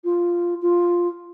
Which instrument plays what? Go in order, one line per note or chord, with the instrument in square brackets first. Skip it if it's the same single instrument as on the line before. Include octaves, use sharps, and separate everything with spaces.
[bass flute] F4
F4